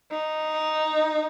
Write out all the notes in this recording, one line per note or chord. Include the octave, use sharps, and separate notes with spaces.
D#4